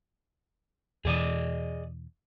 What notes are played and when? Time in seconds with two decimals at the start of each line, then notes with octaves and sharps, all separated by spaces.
1.05 E2 B2 E3 G#4 D5 D#5